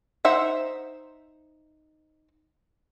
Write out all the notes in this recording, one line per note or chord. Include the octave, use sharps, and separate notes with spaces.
D#4 C5 E5 F#5